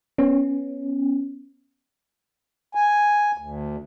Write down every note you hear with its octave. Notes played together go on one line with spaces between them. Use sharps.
B3 C#4
G#5
D2